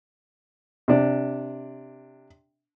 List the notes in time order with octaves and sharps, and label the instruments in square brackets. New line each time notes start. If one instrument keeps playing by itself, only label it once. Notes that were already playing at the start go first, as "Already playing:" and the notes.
[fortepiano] C3 D4